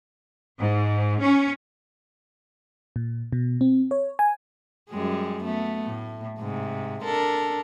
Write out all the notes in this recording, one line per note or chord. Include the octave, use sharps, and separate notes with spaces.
G#2
C#4
A#2
B2
C4
C#5
G#5
F#2 G3 G#3
A3 B3
A2
G#2 C3
D4 A4 A#4